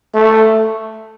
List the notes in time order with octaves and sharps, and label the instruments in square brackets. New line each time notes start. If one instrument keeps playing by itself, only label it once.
[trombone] A3